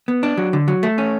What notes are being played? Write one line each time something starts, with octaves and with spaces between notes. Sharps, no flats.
B3
D4
F#3
D3
F#3
A3
C#4